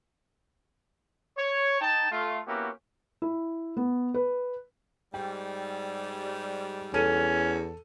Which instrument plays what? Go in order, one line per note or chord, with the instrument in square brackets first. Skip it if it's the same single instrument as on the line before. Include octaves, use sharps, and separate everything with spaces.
[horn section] C#5
D#4 G5 A5
A3 F4
A#3 B3 C#4 E4 F#4 G4
[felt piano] E4
B3
B4
[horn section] G#2 G3 [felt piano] G5
[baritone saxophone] E2 [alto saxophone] C#4 [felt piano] A4 D#7